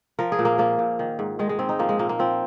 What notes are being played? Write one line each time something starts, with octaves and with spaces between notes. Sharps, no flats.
F3 A#4
G#4
A#2
A#3
F3 A#3
A#2
D#3
G#2
D#3 G#3
G#3
G#2 C4
D#4
F3 A#3
G#3
A#2 A#3
A#3
F3 C4